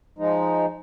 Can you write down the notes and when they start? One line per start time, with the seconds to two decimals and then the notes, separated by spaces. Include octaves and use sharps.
0.19 F3 G#3 D#4